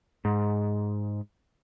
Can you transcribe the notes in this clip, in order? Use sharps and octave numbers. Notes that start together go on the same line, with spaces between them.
G#2